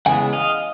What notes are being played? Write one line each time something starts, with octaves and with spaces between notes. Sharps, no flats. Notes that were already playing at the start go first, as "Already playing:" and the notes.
C#3 E3 G#3 B3 F#5 G#5
D#5 F5